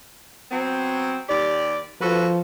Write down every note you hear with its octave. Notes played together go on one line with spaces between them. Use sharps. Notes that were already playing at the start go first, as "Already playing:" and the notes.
F#3 B3 C4
D#2 G4 D5
F3 F#4 A4 B4